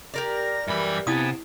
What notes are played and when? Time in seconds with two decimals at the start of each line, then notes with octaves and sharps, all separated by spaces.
0.14 G4 A#4 D5 A#6
0.68 F#2 E3 G3 E5 B5
1.07 C3 B3 E4 F5 G#5 A5 D#6